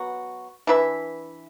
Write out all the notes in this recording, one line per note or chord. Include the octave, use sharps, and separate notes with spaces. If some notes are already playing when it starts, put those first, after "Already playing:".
Already playing: F#3 B3 F#4
E3 D4 B4 E5